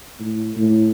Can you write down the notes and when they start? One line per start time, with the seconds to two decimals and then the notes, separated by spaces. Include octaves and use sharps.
0.20 A2
0.56 A2